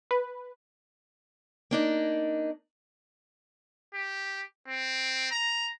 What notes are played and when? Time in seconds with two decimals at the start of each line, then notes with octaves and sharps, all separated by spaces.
0.11 B4
1.71 A#3 D4 D#4
3.94 G4
4.68 C4
5.31 A#5